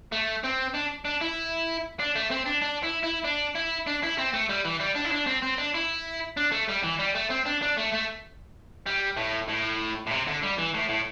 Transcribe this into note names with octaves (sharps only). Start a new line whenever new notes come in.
A3
C4
D4
D4
E4
D4
A3
C4
D4
D4
E4
E4
D4
E4
D4
E4
C4
A3
G3
E3
G3
D4
E4
D4
C4
C4
D4
E4
D4
A3
G3
E3
G3
A3
C4
D4
D4
A3
A3
G3
A2
A2
A2
C3
D3
G3
E3
A2
A2